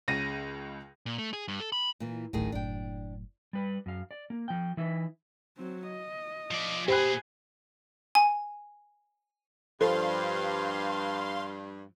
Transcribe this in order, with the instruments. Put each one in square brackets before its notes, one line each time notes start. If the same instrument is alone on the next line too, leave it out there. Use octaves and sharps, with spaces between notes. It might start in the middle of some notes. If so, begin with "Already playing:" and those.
[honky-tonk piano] C#2 C#3 A#6 D#7
[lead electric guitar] A#2
A3
G#4
G2
A4
B5
[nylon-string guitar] A#2 E3
[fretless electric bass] D1 A1 [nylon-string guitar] A2 D#3 G#4
[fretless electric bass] F#1 F#2 A2 [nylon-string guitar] D4 G5
[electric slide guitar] G3 B4
F#2 F5
D5
A#3
F3 G5
E3 D#4 B4 E5
[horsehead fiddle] F#3 C4
D#5
[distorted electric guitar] F3 D5
[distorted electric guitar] A#2 G#4 [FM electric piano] G4 [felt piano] C5 B5 F#6 [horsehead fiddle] G#5
[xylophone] G#5
[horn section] G2 [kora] F3 [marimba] A4 [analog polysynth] F5 C6